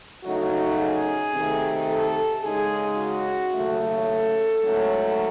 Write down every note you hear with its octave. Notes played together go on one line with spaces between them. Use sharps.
C#3 F#3 A3 D#4 F#4
G#4
C3 D#3 A3
A4
C#3 G#3 D#4 G#4
F#4
D#2 C#3 F#3 A3
A4
G#2 F#3 A3 C#4